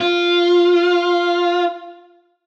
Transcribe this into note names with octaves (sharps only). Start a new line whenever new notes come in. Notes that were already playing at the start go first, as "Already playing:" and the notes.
F4